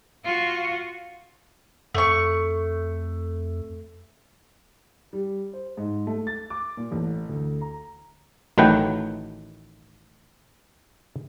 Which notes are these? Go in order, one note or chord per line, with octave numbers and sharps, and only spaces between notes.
F4 F#4
F2 A3 C#6
G3
C5
G#2
A3
A6
D6
A#2
A1
D2
A#5
A1 D#3 F#3 A3 B4 G5